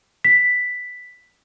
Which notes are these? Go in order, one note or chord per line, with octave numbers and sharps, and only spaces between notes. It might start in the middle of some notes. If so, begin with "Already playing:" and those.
B6